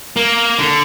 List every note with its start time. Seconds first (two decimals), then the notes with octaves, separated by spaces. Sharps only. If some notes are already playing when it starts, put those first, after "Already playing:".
0.17 A#3
0.58 D3